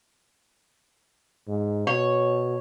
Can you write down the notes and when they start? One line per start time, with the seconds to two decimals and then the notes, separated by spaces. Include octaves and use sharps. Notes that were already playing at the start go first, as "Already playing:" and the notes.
1.48 G#2
1.87 B2 C#5